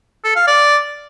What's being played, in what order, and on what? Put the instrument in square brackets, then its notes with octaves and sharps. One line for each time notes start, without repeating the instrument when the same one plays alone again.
[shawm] A4
F5
D5